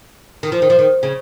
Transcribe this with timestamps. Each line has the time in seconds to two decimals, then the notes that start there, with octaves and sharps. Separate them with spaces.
0.43 D#3
0.52 F3
0.62 D#3
0.70 F3
0.79 D#3
1.03 C#3